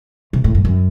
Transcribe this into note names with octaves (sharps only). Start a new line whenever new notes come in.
C3
A2
F#2
F#2